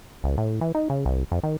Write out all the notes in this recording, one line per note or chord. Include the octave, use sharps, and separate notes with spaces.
C#2
A2
E3
D#4
C#3
C2
F2
D#3